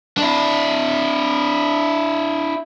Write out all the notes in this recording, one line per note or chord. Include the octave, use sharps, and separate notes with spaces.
D4 E4